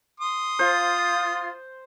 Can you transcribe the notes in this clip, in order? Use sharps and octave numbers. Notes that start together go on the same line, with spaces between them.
C6 D#6
F4 C5